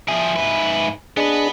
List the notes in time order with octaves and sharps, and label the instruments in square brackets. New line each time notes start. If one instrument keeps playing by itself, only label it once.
[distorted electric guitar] F3 G#4 [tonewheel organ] E5 G#5
[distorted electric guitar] G#2 B4
[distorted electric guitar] B3 B4 [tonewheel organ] D4 G#4 D#5